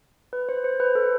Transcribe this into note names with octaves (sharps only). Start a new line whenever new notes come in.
B4
C5
C5
B4
A4